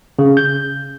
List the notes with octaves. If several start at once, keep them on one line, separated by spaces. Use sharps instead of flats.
C#3
G6